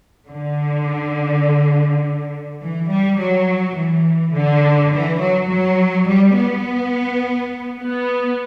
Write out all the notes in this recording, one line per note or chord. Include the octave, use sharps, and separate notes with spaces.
D3
E3
G3
F#3
E3
D3
E3
F#3
F#3
G3
B3
B3